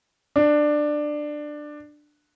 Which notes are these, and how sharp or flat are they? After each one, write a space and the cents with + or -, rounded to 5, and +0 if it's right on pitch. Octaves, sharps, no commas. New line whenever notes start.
D4 +15